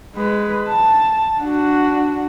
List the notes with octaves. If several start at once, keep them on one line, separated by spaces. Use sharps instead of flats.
G#3 B4
A5
D4 F#4